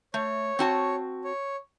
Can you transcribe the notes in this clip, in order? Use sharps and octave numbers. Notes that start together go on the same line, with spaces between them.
A3 C#5
C4 F#4 A5
C#5